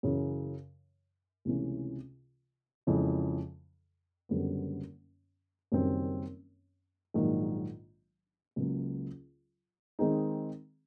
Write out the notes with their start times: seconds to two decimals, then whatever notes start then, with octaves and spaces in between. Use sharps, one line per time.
0.03 F#2 C#3 E3
1.45 C#2 C3 E3 A3 C#4
2.87 F2 C#3 E3 G#3
4.29 F#1 F#2 D3 G3 B3
5.72 F#1 F#2 D#3 G3 C4
7.14 A#1 G#2 D#3 F#3 A#3
8.56 C#2 C#3 F#3 A#3
9.99 D#3 G#3 C4 D#4 G#4